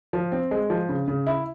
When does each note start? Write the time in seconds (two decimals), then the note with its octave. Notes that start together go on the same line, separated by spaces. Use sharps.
0.13 F3
0.32 C4
0.51 G#3
0.70 F3
0.89 C#3
1.08 C#3
1.27 E4